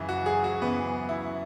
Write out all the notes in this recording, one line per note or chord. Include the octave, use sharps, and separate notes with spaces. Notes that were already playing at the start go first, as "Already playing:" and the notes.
Already playing: F#2 C#3 E3
F#4
G#4
F#4
F#2 C#3 E3 B3
E4